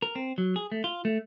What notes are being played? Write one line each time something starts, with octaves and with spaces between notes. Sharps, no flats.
A#4
C4
F#3
G#4
A3
F4
A3